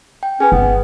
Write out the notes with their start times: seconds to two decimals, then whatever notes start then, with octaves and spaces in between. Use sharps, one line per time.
0.23 G5
0.40 C#4 G#4 B4
0.52 G1 B3